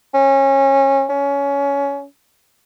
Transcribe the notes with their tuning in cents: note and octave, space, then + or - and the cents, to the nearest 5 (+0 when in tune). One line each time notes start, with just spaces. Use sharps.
C#4 -25
C#4 +20